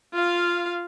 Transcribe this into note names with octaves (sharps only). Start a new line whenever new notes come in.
F4 F5